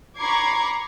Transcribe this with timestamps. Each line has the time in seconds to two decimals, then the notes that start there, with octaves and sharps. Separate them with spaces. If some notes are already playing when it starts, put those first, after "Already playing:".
0.17 A#5 B5 C#6 D6 G#6 C7